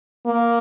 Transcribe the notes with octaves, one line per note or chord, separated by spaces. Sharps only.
A#3